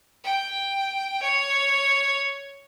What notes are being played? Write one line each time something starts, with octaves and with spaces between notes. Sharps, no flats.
G5
C#5